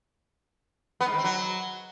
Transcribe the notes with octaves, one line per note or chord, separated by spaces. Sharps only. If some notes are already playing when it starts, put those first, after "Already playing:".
B3
G#2
D#3
C4
F#3